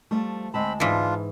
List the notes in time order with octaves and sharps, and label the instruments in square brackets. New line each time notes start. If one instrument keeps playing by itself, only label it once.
[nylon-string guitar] F3 G3 A3
[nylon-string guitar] D2 G#3 A5 [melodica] C4 B5
[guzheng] G#2 E3 [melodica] D4 F4